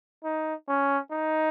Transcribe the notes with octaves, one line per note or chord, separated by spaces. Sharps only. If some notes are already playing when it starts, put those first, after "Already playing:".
D#4
C#4
D#4